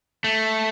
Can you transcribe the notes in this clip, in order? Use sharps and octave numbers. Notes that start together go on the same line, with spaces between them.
A3